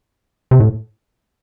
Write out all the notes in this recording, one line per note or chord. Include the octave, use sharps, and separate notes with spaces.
C3
A2